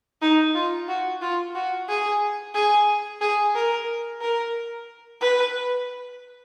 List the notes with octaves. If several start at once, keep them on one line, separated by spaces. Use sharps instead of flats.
D#4
F4
F#4
F4
F#4
G#4
G#4
G#4
A#4
A#4
B4